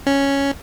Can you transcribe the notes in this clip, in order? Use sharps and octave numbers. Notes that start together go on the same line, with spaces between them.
C#4